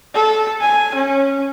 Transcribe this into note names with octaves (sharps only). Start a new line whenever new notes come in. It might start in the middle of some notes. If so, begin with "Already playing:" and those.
A4
G#5
C#4